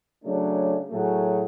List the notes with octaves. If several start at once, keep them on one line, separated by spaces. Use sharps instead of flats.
C#3 F#3 A3 C#4 D4
A2 F#3 A3 F#4 G#4